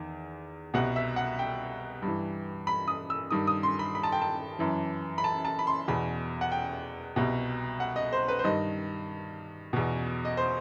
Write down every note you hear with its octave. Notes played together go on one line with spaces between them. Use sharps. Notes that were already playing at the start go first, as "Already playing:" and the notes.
Already playing: E2 D#3
C2 B2 F#5
E5
F#5
G5
G2 E3
B5
D#6
E6
G2 D#3 D#6
D#6
C6
B5
B5
A5
G5
A5
F#2 E3
B5
A5
A5
B5
C6
E2 B2 B5
F#5
G5
C2 B2
F#5
D#5
C5
B4
C5
G2 D#3 D#5
E2 B2
D#5
C5